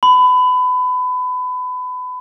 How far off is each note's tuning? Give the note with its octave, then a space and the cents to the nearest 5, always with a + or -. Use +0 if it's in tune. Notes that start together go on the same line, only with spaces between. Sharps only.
B5 +25